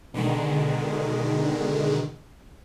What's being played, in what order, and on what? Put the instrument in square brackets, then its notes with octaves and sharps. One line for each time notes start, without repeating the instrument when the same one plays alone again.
[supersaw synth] B2 D3 D#3 G#3